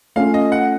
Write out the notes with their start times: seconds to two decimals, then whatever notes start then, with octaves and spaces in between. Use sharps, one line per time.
0.16 A3 C#4 F4 F5
0.34 D#5
0.52 F#5